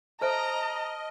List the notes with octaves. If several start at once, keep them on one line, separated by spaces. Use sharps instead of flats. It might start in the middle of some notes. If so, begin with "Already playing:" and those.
A4 C5 D#5 E5 A5 A#5 F6 D7